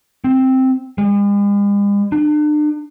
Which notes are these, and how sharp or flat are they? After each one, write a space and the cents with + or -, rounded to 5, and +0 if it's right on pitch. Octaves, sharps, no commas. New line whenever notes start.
C4 +0
G#3 -45
D4 +40